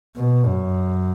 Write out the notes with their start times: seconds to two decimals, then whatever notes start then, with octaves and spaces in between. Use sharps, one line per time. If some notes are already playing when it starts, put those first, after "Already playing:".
0.16 B2
0.46 F#2